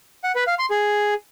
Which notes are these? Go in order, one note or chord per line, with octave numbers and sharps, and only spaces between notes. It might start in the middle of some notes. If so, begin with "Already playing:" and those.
F#5
B4
F5
C6
G#4